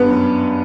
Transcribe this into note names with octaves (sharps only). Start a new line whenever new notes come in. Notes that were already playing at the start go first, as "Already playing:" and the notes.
Already playing: G2 B3 B4
F#2